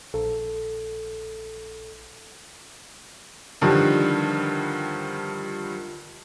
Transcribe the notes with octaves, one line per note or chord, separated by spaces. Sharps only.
A#1 A4
G2 D3 D#3 F3 G3